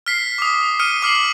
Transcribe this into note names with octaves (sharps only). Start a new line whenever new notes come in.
F6 B6 C7
D6 D#6
D#6 F6 C#7 D#7
D6 F6 C7 F#7